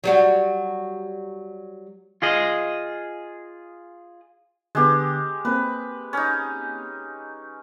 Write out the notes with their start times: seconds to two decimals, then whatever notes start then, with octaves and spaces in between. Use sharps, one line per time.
0.04 F#3 G3 F#4
2.22 F4 G#4 D#5
4.75 D3 G#3 B3 G4
5.45 A#3 C4 B4
6.13 C#4 D#4